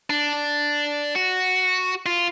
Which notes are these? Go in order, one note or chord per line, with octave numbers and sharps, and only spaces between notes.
D4
F#4
F4